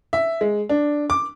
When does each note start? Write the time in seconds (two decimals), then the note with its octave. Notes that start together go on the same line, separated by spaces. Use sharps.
0.13 E5
0.41 G#3
0.69 D4
1.10 D6